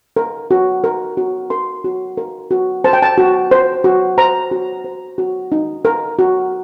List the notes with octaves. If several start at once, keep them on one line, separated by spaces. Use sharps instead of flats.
A#4
F#4
A#4
F#4
A#4 C6
F#4
A#4
F#4
C5 A5
G5
A5
F#4
C5
F#4
C5 A#5
F#4
C5
F#4
D#4
A#4
F#4